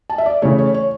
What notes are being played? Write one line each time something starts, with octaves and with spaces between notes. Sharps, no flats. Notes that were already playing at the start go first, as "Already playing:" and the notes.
A5
E5
D5
C#3 E3 A3 C#5
C#5
C#5